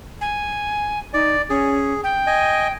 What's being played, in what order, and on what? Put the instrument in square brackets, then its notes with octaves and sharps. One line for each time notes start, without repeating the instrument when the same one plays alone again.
[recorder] G#5
[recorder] D#4 [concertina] D5
[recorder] C#4 [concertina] G#4
[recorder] G5
[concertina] D#5 G#5